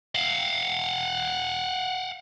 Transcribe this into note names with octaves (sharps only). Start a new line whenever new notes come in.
F5 F#5